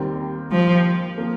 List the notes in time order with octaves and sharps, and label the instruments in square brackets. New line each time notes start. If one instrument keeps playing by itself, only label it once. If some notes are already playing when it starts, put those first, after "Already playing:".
Already playing: [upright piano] D#2 D#3 G3 C4
[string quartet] F3
[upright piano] F3 A#3